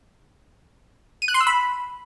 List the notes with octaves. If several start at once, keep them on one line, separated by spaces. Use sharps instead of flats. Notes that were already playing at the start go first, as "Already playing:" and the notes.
D#7
F#6
C6
E6
B5